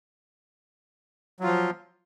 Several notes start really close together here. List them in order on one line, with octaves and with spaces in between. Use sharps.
F#3 F4 F3